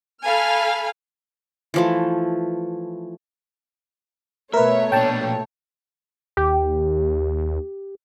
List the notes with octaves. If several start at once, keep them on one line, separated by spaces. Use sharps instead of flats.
A4 F5 G#5 B5 F6
E3 F3 A3
B2 A3 A#4 B4 C#5 E5
A#2 D4 G5 A5
D#2 G4